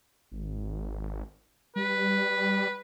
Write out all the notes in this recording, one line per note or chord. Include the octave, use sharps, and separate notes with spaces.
G#1
G3 B4